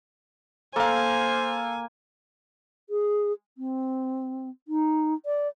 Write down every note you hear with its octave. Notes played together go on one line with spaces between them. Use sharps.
A#3 A4 C5 F5 G#5
G#4
C4
D#4
D5